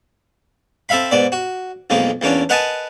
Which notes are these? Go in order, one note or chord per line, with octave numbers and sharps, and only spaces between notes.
C4 A4 E5 F5 B5
G#2 B3 D5
F#4
B1 F2 G#3 A#3
E2 A#3 C#4 D4
A#4 B4 D#5 F#5 G#5 A5